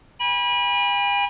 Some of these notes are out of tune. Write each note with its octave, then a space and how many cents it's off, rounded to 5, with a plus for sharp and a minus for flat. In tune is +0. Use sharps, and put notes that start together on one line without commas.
G#5 -45 B5 -30